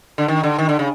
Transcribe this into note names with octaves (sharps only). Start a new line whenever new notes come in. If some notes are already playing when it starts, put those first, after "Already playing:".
D3
D#3
D3
D#3
D3
C#3